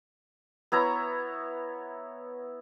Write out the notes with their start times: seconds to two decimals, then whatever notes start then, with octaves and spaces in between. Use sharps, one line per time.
0.72 B3 E4 C#5 A#5